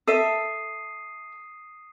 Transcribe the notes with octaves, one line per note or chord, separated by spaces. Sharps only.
A4 E5 D#6 C7 D#7